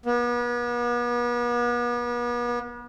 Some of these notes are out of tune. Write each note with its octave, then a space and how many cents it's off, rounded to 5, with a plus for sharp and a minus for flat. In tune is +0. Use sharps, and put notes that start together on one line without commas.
B3 -40